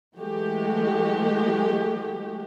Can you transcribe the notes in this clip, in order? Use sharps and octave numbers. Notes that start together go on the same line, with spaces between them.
E3 F#3 G#3 A3 F#4 G4